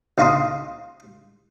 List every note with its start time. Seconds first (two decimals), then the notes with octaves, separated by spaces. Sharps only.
0.18 C#2 D#4 F5 A#5 C6 D#6